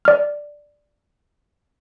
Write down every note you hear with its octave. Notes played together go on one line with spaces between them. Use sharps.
D5 F6